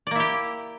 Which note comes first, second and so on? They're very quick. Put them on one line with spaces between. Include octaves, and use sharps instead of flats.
D5 A#3 E4 G4